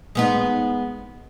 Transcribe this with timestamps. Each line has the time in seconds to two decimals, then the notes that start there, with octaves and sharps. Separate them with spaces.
0.15 G#3 B3 D#4